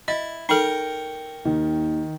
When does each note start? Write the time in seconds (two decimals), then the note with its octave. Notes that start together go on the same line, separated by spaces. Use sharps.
0.08 E4 D#5 A6
0.49 D#4 A4 A#4 G5 C#6
1.45 D#2 D#3